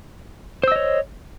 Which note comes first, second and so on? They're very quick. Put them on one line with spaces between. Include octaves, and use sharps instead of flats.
C5 E6 D#5 C#5